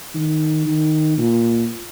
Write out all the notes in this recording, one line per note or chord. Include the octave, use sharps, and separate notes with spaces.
D#3
D#3
A#2